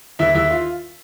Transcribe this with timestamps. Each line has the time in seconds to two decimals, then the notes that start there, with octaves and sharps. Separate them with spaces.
0.19 D#2 E4 E5
0.35 D#2 E4 E5
0.50 F4